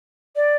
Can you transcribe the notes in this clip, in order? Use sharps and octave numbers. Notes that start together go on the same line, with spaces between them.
D5